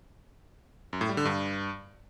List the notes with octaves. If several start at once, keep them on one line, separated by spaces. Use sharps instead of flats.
F#2
A2
G3
D3
G2